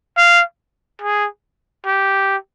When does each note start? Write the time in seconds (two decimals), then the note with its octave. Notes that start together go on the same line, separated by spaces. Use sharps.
0.17 F5
1.01 G#4
1.85 G4